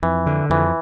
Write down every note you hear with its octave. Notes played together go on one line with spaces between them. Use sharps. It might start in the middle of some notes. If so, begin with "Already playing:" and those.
F2 E3
D3
F2 E3